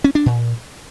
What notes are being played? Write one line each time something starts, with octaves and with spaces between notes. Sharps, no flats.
C#4
D4
A#2